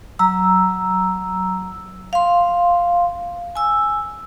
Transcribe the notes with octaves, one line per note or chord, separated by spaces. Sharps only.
F#3 A#5 E6
F5 C6
G#5 E6